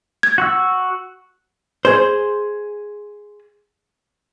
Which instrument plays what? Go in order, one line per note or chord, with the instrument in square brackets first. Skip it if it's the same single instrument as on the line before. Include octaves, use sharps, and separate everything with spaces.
[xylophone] G#6
[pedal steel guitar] F#4 C#6 E6
[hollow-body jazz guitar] G#4 C5